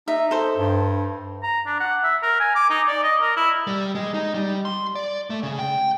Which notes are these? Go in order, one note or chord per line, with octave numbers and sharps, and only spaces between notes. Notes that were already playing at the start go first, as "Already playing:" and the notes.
D#4 E5
A4 C5
G2
A#5
D4
F#5
E5
A#4
G#5
D6
D#4
D5
D#5
A#4
E4
G3
G#3
D#4
G3
C6
D5
A3
C#3
G5